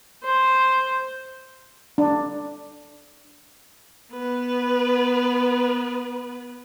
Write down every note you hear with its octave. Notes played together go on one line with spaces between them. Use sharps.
C5
D4
B3 B4